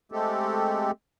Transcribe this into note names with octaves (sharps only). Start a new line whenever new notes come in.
G#3 A3 C4 G4 A4